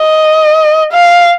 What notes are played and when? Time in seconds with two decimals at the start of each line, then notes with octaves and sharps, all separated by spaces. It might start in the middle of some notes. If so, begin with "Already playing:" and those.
Already playing: D#5
0.93 F5